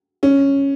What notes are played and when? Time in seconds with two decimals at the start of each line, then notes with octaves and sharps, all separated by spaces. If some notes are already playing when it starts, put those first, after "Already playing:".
0.23 C#4